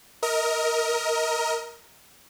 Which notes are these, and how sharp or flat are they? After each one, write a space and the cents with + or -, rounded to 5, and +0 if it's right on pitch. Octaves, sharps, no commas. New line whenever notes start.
A#4 +0 D#5 +30